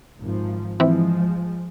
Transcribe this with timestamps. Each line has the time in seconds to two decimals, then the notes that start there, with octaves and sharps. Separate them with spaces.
0.19 G#1 F3
0.80 E3 F3 G#3 C4 E4